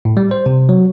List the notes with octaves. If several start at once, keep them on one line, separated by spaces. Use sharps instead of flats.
A2
G3
C5
C3
F#3